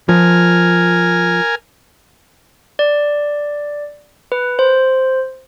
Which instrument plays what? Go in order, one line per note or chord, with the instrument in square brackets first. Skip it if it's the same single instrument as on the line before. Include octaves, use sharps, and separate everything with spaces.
[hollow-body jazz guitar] F3 [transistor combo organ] A#4 G#5 F6
[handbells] D5
B4
C5